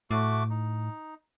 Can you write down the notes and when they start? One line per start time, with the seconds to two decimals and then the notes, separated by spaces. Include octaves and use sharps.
0.11 A2 A3 F#4 D6
0.50 D#4